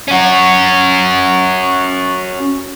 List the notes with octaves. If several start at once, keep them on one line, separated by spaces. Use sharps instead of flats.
C#4 F#4